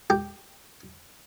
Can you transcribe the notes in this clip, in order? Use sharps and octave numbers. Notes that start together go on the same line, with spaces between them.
G4